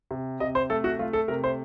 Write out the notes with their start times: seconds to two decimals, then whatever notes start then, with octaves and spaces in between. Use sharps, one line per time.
0.11 C3
0.40 C3 D#5
0.55 C5
0.70 A3 A4
0.84 F#4
0.99 A3 F4
1.13 A4
1.28 C3 A#4
1.44 C5